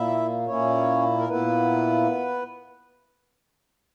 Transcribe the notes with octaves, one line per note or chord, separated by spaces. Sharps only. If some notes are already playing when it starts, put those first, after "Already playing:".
Already playing: A#2 A#3 E4 E5
A#2 A#3 C#4 E4 C#5
A#4
A#2 A#3 B3 E4 B4